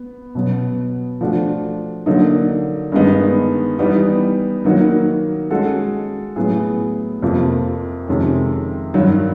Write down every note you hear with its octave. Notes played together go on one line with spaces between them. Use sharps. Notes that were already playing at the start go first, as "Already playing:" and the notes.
Already playing: B3
B2 F#3 B3
F3 A3 D4 F#4
D3 F#3 A#3 D#4
G2 D#3 G#3 B3 D#4
E3 G3 B3 D#4
D#3 F#3 A#3 D#4 F#4
G#3 C#4 F#4 A4
A2 F#3 B3 E4 G#4
F2 C3 F3 A#3
F2 C3 D#3 G#3 C#4
G2 D#3 F#3